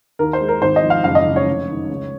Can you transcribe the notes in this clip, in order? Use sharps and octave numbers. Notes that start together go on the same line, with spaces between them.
D#2 A#4
C5
G#3
A#4
G#1 C5
D#5
F3
F5
F#1 F5
D#5
C#3
C#5
F1
D#3
C#2